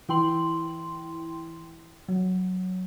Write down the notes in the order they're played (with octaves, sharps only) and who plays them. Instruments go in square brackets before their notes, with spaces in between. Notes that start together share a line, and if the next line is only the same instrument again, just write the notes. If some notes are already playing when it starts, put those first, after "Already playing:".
[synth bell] E3 E4 G5 C6 F#7
F#3